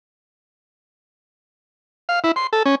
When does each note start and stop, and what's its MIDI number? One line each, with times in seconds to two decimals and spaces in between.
2.09 2.19 77
2.24 2.32 64
2.36 2.47 84
2.53 2.63 69
2.66 2.75 61